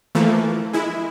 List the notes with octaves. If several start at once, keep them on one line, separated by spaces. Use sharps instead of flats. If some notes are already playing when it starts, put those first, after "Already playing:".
E3 F3 A3 A#3
G#3 E4